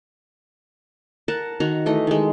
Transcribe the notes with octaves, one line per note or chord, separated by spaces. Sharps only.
A#4 F#5 A5
D#3 F#4 A#5
E3 A3 D#5
D#3 G#3